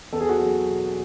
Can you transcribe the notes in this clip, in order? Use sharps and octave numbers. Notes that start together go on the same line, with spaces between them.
E2 A4
G#4
F#4
F#3 G#4
B2